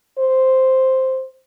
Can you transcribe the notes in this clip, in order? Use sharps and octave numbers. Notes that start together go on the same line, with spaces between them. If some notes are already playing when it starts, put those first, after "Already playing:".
C5